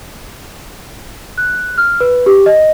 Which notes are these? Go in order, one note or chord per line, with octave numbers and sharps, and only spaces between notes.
F#6
F6
B4
G4
D#5